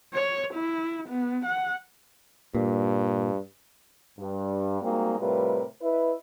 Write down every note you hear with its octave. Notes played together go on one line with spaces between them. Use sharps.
C#5
E4
B3
F#5
G2 A#2
G2
G3 G#3 A#3 C4 D#4 F#4
A2 C3 G3 F4 A#4 B4
E4 B4 D#5